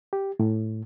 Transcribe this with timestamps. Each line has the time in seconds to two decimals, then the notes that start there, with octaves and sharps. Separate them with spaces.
0.13 G4
0.40 A2